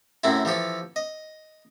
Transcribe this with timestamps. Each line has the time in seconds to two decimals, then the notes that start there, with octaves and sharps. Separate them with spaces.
0.24 F#2 A2 C3 C4 E4
0.45 E3 F3 G4 A4
0.96 D#5